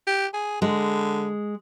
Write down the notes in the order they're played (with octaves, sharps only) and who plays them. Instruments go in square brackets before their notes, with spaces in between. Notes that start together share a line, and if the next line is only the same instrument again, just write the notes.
[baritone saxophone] G4
G#4
[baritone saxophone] D3 [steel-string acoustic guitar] G#3